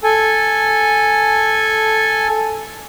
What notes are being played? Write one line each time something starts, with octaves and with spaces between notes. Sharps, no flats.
A4 G#5